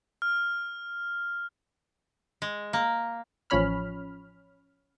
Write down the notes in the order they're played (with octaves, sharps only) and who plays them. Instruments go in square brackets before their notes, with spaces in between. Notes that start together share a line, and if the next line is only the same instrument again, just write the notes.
[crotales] F6
[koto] G#3
A#3
[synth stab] A1 F3 C#4 C#5 B5 F6